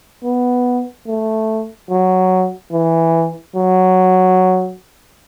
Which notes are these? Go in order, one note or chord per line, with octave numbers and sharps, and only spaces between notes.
B3
A3
F#3
E3
F#3